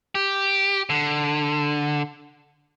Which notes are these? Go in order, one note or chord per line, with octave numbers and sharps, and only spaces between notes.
G4
D3